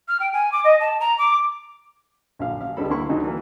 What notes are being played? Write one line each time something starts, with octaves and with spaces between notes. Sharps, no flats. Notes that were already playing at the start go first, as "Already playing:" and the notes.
F6
G5
G#5
D6
D#5
A5
A#5
D6
A#1 D3 F#3 F5
A1 F5
C#2 D3 G3 G#3 A4 B5
D2 D3 A#3 E4 C6 C#6
D2 C#3 F#3 D4 D#4 A4
E3 F#3 A#3